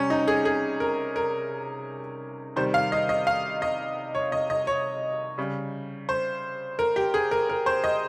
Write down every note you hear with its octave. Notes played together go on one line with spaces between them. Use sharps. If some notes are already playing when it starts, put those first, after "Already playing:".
Already playing: C3 G3 C#4
D#4
G#4
G#4
A#4
A#4
C3 D#3 G3 C5
F5
D#5
D#5
F5
D#5
C#5
D#5
D#5
C#5
C#3 G3
C5
A#4
G4
G#4
A#4
A#4
C5
D#5